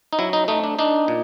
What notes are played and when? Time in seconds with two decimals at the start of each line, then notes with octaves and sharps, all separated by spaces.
0.13 D#4
0.19 F#3 E4
0.33 D#4
0.48 A3 D#4
0.64 D4
0.79 D4 D#4
1.08 A#2